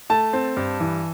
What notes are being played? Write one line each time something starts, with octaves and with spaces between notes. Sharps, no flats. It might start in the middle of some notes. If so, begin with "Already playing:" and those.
A3 A5
C4
G2
E3